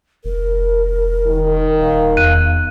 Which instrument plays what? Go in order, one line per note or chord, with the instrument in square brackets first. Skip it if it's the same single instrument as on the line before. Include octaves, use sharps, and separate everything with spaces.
[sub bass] E1 [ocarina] A#4
[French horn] D#3
[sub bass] D#1 [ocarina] F5
[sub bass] E2 [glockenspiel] F#6 D#7